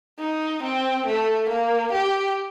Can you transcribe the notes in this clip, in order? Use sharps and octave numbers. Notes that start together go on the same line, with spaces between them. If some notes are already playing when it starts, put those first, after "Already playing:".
D#4
C4
A3
A#3
G4